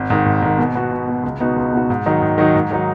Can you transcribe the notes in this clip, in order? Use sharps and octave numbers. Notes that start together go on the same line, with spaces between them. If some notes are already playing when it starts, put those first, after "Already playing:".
Already playing: G#1
G#2 D#3
G#1
G#2 D#3
B2
B3 F#4
B2
B3 F#4
C#2
B2 B3 D#4 F#4
C#2
B2 B3 D#4 F#4
G#2
D#3 F#3 D#4
G#2
D#3 F#3 D#4
G#2
D#3 F#3 D#4